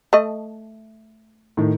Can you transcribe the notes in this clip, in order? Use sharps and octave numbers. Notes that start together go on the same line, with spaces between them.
A3 D#5
A2 D#3